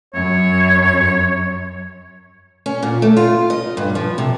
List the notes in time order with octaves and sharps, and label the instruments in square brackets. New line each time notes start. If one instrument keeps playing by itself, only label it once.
[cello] F#2 [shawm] C#5
[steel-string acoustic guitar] C#4
A#2
A3
F4
D#5
G2
F3
C3